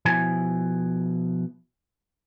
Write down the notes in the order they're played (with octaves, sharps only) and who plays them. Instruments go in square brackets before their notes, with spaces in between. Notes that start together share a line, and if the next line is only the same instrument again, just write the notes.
[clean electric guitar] B2 F3 E4 G#5